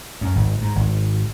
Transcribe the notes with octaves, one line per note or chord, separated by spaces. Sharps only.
F#2
G#1
G#2
G#1